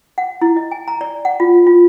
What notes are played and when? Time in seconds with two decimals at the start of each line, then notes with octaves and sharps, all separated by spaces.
0.18 F#5
0.41 E4
0.57 D#5
0.71 G#5
0.88 A#5
1.01 D5
1.25 F#5
1.40 F4
1.67 F4